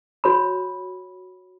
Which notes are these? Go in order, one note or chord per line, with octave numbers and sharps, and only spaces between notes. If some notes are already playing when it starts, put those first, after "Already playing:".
F#4 C#5 B5